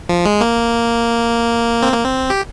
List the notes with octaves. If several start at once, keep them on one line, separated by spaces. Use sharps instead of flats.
F3
G#3
A#3
C4
A#3
C4
G4